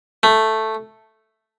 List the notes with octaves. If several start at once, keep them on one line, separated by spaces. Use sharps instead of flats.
A3